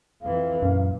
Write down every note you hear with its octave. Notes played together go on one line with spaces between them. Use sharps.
F2 E3 F5
F#2 A#2